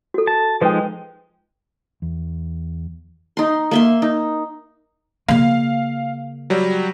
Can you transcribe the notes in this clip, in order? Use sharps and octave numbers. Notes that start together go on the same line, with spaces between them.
F#4 A4
A5
F3 G#3 D#4 B4 G5
E2
D#4 C6
A#3 E5 C6
D#4
C#3 A#3 F5
F#3 G3